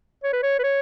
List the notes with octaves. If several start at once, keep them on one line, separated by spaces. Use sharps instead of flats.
C#5
B4
C#5
B4
C#5